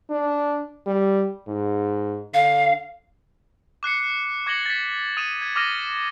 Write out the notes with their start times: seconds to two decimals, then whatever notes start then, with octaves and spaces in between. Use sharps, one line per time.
0.10 D4
0.87 G3
1.48 G#2
2.34 D3 F5
3.83 D6 F#6 C7 C#7
4.47 D6 G#6 A#6 C#7 F#7 G7
4.66 A6 B6
5.17 D#6 D#7 E7
5.41 G#6
5.56 D6 D#6 F6 A#6 D#7